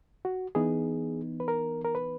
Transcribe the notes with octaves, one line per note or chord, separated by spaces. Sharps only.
F#4
E3 B3 D#4 G#4
B4
A#4
A#4
B4